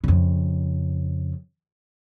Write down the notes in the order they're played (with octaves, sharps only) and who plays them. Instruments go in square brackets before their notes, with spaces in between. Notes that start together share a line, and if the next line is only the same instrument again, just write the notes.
[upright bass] F2 C#3